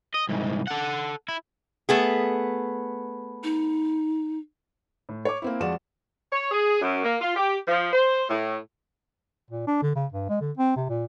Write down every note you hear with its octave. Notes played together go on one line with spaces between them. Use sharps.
D#5
C2 G#2
A4 F#5
E4
A3 B3 G#4
D#4
A2
C#5 D6
A#3 C4 E4
F2 F3 G#3 F#4 D5 E7
C#5
G#4
F#2
A#3
F4
G4
F3
C5
A2
A#2
D4
D3
C#3
G2
G#3
D3
C4
C3
A#2